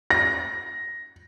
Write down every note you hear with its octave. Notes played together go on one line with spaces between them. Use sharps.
A#6